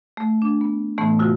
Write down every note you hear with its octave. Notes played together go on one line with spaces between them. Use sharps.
A3
D4
B3
A2 E3 A3 B3
C3 F4 F#4